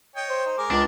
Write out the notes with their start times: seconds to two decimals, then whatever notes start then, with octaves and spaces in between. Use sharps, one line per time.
0.16 C#5 D#5 G5
0.29 C5
0.46 D#4
0.58 G#3 A#4 D6
0.71 C#2 D4